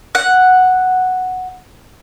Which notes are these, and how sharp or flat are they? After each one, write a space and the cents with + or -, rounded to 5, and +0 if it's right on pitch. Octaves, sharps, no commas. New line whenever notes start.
F#5 +0